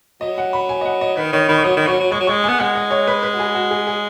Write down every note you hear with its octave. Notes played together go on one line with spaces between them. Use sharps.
F#3 D#5
F#5
B5
G#5
D#5
F#5
D#5
D#3 B4
D#3 C#5
D#3 B5
C#6
F#3 D#6
D#3
F#3 C#6
F#3
G#3 C#6
F#3
G#3 C#6
B3 G#5
G#3 F#5
D#5
C#5
B4
B4
F#4
G#4
F#4
G#4
G#4